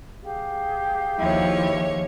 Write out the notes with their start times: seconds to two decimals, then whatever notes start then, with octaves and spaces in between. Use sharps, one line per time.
0.22 G4 G#4 F5
1.19 D#2 F3 E4 C#5